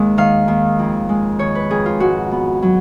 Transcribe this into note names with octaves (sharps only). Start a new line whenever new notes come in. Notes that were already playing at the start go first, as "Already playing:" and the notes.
Already playing: D#2 G#3
D#3 F5
D#2
F2
G#3
D#3 C#5
B4
F2 G#4
F4
G#2 F#4
B3
F#3